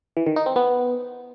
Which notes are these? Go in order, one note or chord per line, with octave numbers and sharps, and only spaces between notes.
E3
D#3
D#4
C4
B3